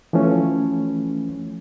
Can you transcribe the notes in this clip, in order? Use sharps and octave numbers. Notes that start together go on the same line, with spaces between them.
E3 F3 A3 C#4